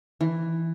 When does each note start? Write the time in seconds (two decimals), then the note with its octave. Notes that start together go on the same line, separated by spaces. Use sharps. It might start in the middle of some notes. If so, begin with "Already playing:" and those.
0.21 E3